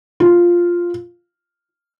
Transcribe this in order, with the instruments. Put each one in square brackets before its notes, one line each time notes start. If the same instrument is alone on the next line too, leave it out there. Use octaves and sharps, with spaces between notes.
[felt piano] F4